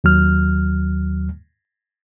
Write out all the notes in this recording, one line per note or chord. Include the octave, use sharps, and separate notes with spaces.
D#2 F#3 F6